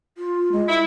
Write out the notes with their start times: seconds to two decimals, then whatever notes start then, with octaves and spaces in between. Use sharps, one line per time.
0.18 F4
0.52 G#3
0.68 E4